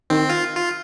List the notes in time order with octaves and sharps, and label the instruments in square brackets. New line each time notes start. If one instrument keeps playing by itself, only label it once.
[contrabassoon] D#3 [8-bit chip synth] C4
[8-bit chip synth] F4
F4